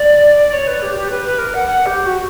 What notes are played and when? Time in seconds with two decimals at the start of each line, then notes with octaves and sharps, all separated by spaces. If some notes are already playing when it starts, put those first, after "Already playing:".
Already playing: D5
0.52 C#5
0.67 B4
0.82 G4
0.95 G4
1.10 B4
1.25 B4
1.38 A#4
1.53 F#5
1.67 F#5
1.86 G4
2.05 F#4